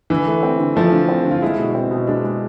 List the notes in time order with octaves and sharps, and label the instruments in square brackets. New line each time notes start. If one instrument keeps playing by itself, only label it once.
[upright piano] D3 [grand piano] E3
[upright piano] A3
C4
D3
[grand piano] F3 [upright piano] A3
[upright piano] D3
C4
[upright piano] D3 [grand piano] F4
[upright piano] G#3 [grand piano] E4
[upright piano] B2
C4
B2
[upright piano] G#3 [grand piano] D4
[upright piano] G#3